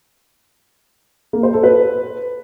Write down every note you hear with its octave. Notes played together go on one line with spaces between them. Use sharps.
A#3
C5
A4
B4